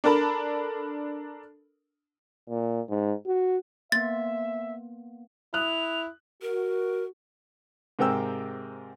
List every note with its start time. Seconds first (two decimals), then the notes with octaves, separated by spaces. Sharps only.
0.04 D4 A4 A#4 A5 B5
2.49 A#2
2.89 G#2
3.26 F#4
3.92 A#3 B3 E5 A6
5.54 E4 D#6 F#6 F7
6.42 F#4 A#4
7.99 G#2 C3 A#4 G5 E6